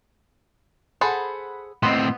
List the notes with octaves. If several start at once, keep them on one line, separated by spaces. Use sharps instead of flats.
G#4 A4 C5 F#5 B5
A2 B3 C4 D#5 C6